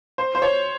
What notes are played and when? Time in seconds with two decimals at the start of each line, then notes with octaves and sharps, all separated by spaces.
0.18 C5
0.35 C5
0.42 C#5